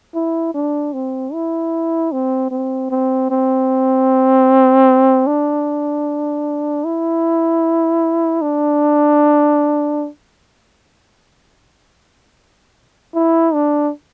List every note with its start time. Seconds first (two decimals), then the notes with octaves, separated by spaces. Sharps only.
0.15 E4
0.54 D4
0.93 C4
1.33 E4
2.12 C4
2.51 C4
2.91 C4
3.30 C4
5.27 D4
6.85 E4
8.42 D4
13.15 E4
13.54 D4